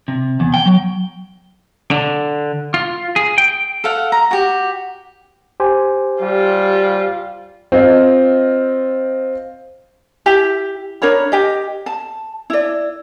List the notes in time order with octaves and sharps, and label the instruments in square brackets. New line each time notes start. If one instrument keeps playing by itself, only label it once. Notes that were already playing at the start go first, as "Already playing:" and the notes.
[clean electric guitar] C3
E2
G5
F#3
D3
F4
G#4
G5
[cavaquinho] A4 F5 F#5
A#5
F#4 G4
[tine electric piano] G4 C5 G#5
[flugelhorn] G3 [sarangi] F4
[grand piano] C4 F4 D#5
[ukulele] E4 G4
D4 A#4 C#5 B5
G4 D#5
A5
E4 D5